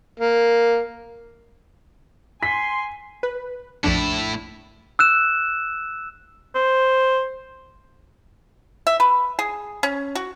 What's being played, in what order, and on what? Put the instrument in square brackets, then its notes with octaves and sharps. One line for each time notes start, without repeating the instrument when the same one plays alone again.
[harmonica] A#3
[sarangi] G#5 [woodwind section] C6 [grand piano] B6
[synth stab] B4
[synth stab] A#1 F2 D4 [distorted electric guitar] A2 E4
[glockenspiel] E6 F#6 E7
[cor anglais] C5
[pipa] E5
B4
G#4
C#4
F#4